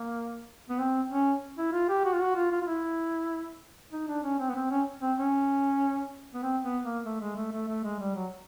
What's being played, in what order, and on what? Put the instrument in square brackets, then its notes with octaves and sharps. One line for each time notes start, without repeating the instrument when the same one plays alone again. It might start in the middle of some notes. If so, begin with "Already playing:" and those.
Already playing: [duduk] A#3
B3
C4
C#4
E4
F4
G4
F#4
F4
F#4
F4
F4
F4
E4
D#4
D4
C#4
C4
B3
C4
C#4
C4
C#4
B3
C4
B3
A#3
A3
G#3
A3
A3
A3
G#3
G3
F#3